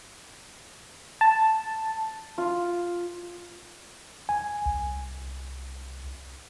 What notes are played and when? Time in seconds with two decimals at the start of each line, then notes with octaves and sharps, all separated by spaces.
1.21 A5
2.38 F4
4.29 G#5
4.66 C2